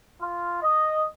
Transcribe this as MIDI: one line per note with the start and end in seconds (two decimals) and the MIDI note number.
0.21 0.61 65
0.62 1.06 75